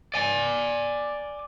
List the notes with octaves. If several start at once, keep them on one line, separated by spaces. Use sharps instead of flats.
D5 G#5